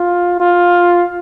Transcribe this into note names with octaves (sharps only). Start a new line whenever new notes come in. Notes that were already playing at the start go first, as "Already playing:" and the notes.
Already playing: F4
F4